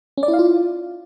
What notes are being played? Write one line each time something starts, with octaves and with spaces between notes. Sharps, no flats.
C#4
D5
E4
F5
F4